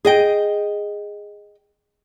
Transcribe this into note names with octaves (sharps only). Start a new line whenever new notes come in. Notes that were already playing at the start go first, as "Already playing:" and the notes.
G#4 D#5 G5